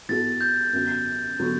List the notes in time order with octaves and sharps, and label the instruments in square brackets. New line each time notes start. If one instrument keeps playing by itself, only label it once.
[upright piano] E3 B3 F#4 A4 [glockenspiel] A6
[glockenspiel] G6
[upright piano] F#2 D3 F#3 B3
D3 F#3 B3